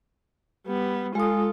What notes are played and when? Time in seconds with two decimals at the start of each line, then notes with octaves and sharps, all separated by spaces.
0.67 G3 B3
1.15 G#3 F4 A4 D#6